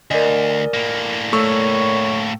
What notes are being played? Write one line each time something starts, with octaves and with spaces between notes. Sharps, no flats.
D2 A#4 D5 D#5 G#5
A2 A#3
A3 C#5 C#6 E6